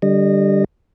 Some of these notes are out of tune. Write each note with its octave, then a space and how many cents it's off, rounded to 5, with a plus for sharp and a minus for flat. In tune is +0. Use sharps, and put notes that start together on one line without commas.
D3 +0 G3 +0 D#5 -25